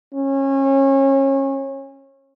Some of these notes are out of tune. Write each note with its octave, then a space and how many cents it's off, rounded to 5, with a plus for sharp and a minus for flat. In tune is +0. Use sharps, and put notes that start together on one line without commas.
C#4 -30